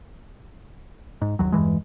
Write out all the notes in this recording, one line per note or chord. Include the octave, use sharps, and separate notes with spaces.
G#2
G1 D#2 F#3
E2 G2 E3 G#3